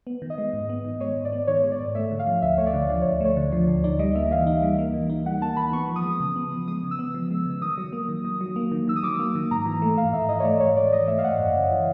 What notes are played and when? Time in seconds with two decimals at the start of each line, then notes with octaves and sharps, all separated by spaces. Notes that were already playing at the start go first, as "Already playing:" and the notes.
0.07 B3
0.22 D#3
0.30 D#5
0.38 G#3
0.53 G#2
0.69 B3
0.85 D#3
1.00 G#3 C#5
1.17 G#2
1.25 D5
1.32 B3
1.47 D#3 C#5
1.64 G#3
1.72 D5
1.80 G#2
1.95 A3 E5
2.11 D3
2.19 F5
2.27 F3
2.42 D2 E5
2.58 A3 C#5
2.67 D5
2.74 D3
2.89 F3 D5
3.02 D2 C#5
3.21 A3 C#5
3.37 D3
3.52 F3
3.68 D2
3.84 D#4 D5
3.99 G3 D#5
4.15 A#3 E5
4.31 E3 F5
4.47 D#4
4.63 G3
4.79 A#3
4.94 E3
5.10 D#4
5.26 G3 F#5
5.41 A#3 A5
5.56 E3 B5
5.73 B3 C#6
5.89 F3
5.96 D#6
6.04 G#3
6.20 C#3
6.36 B3
6.52 F3
6.68 G#3 D#6
6.83 C#3
6.91 E6
6.99 B3
7.14 F3
7.30 G#3
7.46 C#3
7.62 D#3 D#6
7.78 F#3
7.93 A#3
8.09 D#3
8.25 D#3
8.41 F#3
8.56 A#3
8.72 D#3
8.88 D#3 E6
8.96 D#6
9.03 F#3 D6
9.19 A#3
9.35 D#3
9.51 G#2 A#5
9.66 E3
9.82 A3
9.97 G#2 F5
10.13 G#2 E5
10.29 E3 D#5
10.40 C#5
10.44 A3 D5
10.60 G#2 C#5
10.76 G#2 D5
10.92 E3 D#5
11.08 A3 E5
11.18 F5
11.24 G#2 F#5
11.39 F#2
11.55 C#3
11.71 E3